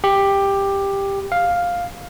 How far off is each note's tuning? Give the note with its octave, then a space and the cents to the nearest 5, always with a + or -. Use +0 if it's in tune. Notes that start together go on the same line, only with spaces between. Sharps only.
G4 +10
F5 +5